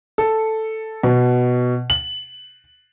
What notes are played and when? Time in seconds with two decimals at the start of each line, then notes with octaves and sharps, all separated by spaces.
0.18 A4
1.03 B2
1.90 F#7